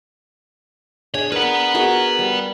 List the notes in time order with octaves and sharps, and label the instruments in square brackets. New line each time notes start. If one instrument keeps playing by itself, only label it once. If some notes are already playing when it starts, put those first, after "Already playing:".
[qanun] D4 G#4 G#5 [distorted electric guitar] C#5
[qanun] A#4 [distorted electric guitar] B4 F#5
[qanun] F#4 G#4 A#4
G3